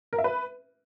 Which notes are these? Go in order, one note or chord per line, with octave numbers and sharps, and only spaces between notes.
A#4
E5
B4